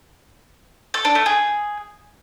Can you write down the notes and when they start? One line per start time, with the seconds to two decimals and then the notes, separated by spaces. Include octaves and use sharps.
0.94 A4
1.05 D4
1.15 A3
1.26 G#4